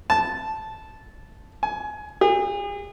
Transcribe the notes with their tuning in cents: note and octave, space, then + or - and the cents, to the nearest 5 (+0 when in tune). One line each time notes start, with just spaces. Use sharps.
A5 -10
G#5 +20
G#4 -40